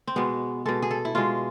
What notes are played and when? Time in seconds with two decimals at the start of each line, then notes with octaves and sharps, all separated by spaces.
0.07 C4
0.16 B2 G#3 B3
0.66 B2 G#3 A4
0.82 G#4
0.91 A4
1.05 E4
1.15 B2 G#3 F4